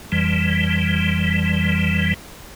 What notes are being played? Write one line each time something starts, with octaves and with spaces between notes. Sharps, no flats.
F2 E3 G3